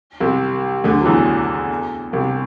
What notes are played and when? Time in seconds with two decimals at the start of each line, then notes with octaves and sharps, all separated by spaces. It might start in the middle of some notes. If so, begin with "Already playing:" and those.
0.20 C2 C3
0.84 D2 D3
1.01 F#3
1.05 E2 E3
2.13 C2 C3